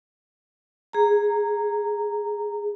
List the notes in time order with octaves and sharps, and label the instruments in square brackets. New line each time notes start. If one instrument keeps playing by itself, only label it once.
[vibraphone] G#4 A#5